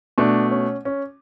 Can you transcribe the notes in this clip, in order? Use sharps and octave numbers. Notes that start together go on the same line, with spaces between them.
B2 A3 D4
C#4
C#4